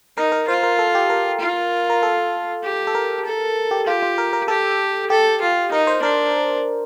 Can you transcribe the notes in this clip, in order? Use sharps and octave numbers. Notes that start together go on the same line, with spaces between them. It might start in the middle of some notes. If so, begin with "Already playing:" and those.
D#4 A#4
A#4
F4 C5
A#4
A4
G4
A#4
F4
A#4
A4
G4
A4
A#4
A4
G4
F4 G4
F4
A#4
A#4
G4 A4
G4 A4
F4
D#4 A#4
C5
D4 A#4